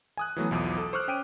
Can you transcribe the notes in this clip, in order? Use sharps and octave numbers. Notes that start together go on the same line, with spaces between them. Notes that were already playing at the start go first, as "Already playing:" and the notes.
G#5 D#6 F#6
E3 F#3 A3 B3
B1 E2 F3 D6 D#6
A4
C5 C#6 D6 F6 F#6
C#4 G5 D7 D#7